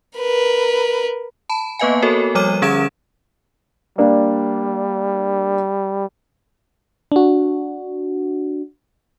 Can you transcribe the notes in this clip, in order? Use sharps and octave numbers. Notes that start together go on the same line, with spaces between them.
A#4 B4
A5 B5
A#3 B3 B4 D#5 F5 G#5
F#4 A4 A#4 C#5
F3 G3 C#5 D6 F6 D#7
D3 C#4 G#4 G#6 D7 E7
G3 A#3 D4
D4 F#4